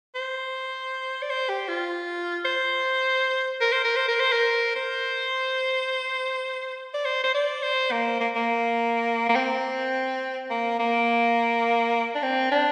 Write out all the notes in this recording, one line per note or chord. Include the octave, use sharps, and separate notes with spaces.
C5
D5
C5
G4
F4
C5
A#4
C5
A#4
C5
A#4
C5
A#4
C5
D5
C5
C5
D5
C5
A#3
A#3
A#3
A#3
C4
A#3
A#3
D4
C4
D4